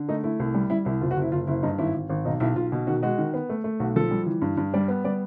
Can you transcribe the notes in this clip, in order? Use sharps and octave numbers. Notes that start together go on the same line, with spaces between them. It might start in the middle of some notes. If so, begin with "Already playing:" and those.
Already playing: D3
A3 D#4
A3 E4
C2
G3
G3 E4
C2 E4
F#1 F4
F#4
F#1
E4
F#1 F4
F#1 E4
G2 D#4
G#1 E4
G#1
G#1
B1 D#4
B1 E4
B1 F4
B2
D#3 F#4
G#3 F#4
D#3
B3
A3
A3
B1 F#4
F3 A4
G3
E3
G2
G2
G3 D5
B3
G3 D5